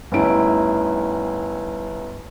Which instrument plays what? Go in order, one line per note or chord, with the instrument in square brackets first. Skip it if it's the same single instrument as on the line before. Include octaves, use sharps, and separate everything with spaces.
[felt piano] G1 D2 C#4 D#4 E4 D7